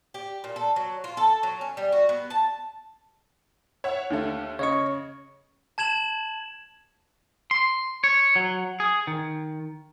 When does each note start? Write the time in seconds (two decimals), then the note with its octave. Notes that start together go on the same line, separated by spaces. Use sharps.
0.14 G4
0.44 A#2
0.56 A4
0.76 F#3
1.04 F4
1.17 A4
1.43 F#3
1.61 C#4
1.77 G3
1.92 F#4
2.09 B3
2.30 A5
3.84 C#5 E5 F#5
4.10 D#2 D3 A3
4.59 C#3 C#5 D#5 C#6
5.78 A5 G#6 E7 F#7
7.51 C6
8.04 C#5
8.36 F#3
8.80 G#4
9.07 D#3